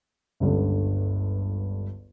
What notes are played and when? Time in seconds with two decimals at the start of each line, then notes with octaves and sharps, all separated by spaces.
0.40 G1 C#2 G2 D3